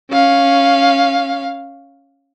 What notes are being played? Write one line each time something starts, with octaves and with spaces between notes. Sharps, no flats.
C#4 F5